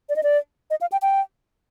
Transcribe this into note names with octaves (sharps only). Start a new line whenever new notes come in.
D5
D#5
D5
D#5
F5
G5
G5